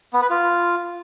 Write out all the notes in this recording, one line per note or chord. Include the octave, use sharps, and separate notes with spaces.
B3
B4
F4